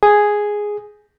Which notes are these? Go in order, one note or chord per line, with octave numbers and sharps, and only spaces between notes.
G#4